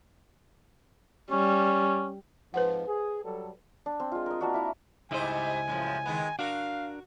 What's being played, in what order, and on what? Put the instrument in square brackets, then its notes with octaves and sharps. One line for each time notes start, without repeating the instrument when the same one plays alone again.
[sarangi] G3 [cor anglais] C#4
[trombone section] F2 G#2 F3 [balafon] B4 C5 F#5
[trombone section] G#4
F#3 G3 A4
[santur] D4
C4
G#3 F4
A#4 D#5
A#3 D4 F#4
E4 A#5
[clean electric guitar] C#2 E4 D#5 [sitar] G#2 G3 C5 [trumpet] G#5
[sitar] F#2 A2 F3
D#3 G#3 B3
[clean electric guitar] D4 A#4 [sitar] F#4 [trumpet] F5